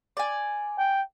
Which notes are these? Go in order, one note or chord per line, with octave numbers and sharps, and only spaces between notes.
D5 G#5
G5